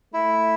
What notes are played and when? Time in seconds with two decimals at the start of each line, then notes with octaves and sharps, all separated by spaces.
0.14 A3 E4